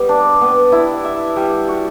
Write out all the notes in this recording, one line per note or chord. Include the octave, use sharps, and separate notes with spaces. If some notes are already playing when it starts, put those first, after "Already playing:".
Already playing: G3 B3
D4
B3
E4
E5
G3
F#4